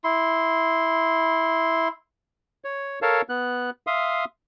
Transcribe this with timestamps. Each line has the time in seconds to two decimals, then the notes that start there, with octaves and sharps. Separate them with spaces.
0.04 E4 C6
2.64 C#5
3.02 A4 A#4 C#5 F5 A5
3.29 B3 F#6
3.87 E5 F5 C6 D#6